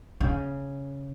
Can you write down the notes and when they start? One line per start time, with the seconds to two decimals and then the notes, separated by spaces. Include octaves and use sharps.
0.20 C#3